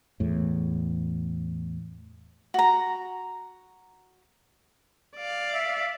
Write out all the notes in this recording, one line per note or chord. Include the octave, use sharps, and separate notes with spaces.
E2 A2
F#4 A#5
D5 F5
E5